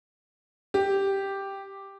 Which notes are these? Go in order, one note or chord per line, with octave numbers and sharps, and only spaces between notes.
G4